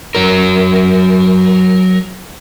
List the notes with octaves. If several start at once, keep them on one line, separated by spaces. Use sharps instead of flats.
F#3 A#4